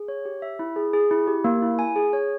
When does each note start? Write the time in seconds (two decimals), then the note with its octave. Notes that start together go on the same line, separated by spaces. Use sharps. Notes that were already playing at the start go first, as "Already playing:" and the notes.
Already playing: G#4
0.08 C#5
0.25 G4
0.42 E5
0.59 E4
0.76 G#4
0.93 G#4
1.11 E4
1.27 G4
1.44 A#3
1.62 E4
1.79 G#5
1.96 G#4
2.13 C#5